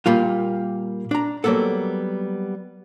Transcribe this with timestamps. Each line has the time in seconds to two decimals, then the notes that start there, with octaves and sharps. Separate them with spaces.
0.06 A#2 G3 A#3 F4
1.11 D4 A#5
1.44 F#3 G3 A#3 B3 A4